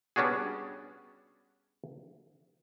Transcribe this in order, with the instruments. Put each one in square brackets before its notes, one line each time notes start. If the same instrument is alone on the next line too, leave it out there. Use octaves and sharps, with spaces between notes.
[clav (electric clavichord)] G3 B3 C#4 D4 F#4 G#4